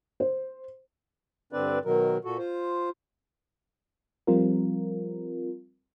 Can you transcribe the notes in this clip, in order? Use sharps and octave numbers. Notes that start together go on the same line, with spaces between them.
C5
G2 D3 C4 D4 B4 D5
B2 D#3 F#3 A#4
A#2 F#4 A4
F4 C5
F3 G3 C4 F4 A#4